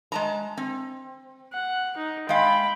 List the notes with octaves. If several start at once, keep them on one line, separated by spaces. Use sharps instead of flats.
G#3 A5 A#5
C4
F#5
D#4
G#3 F5 G5 B5